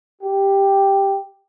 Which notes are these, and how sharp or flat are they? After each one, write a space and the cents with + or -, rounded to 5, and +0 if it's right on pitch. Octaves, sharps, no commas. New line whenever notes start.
G4 +5